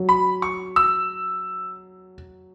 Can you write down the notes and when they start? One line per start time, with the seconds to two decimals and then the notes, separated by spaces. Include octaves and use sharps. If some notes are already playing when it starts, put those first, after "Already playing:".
Already playing: F#3
0.09 B5
0.42 C#6
0.76 E6